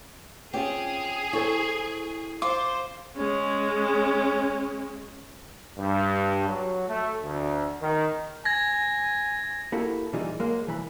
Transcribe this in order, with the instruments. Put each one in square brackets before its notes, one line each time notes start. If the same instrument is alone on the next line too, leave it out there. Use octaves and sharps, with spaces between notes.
[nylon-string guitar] C4 C#4 F4 [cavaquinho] G4 [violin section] G#4
[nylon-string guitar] E4 A4 C5 [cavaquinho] C#5
[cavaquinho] F4 [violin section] C5 [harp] D6
[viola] G#3 C#4
[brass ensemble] G2
F#3
A3
D2
D#3
[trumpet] G#5 [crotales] G#6 A#6
[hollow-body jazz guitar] A#3 E4 F#4 G4 A4
A#2 E3 G3 D#4 F4 G#4
F#3 G#3 A#3 F5
C2 E3 B5